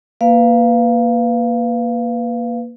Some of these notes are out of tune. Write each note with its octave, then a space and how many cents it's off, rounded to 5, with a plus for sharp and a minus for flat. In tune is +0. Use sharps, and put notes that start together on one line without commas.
A#3 +10 B4 +10 F5 -10